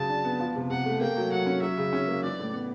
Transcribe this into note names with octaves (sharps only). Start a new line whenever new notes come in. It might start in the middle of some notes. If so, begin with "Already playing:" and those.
Already playing: C#3 F#3 A5
D4
B3
F3
C3
C3 F#5
A3
A#3 G5
F#3
F#3 F#5
C#4
F#3 E5
C#3
C#4
A#3
E3 D5
A2
B3